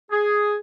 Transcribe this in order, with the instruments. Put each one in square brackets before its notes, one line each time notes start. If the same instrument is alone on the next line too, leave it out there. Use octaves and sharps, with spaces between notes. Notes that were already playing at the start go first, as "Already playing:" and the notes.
[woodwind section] G#4